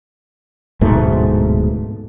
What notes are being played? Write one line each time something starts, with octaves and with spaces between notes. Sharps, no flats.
D1 G#2 B2 A3